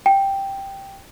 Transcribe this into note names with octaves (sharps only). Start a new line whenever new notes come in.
G5